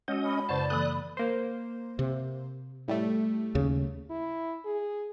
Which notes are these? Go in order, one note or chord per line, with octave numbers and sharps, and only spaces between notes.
G#3 C#4 F#4 D#5
B5
F#2 C#3 C5 D5 A5
E3 A#3 A4 D#6 F#6
A#3 C5
C3
A2 G3 A3
D#2 C#3
E4
G#4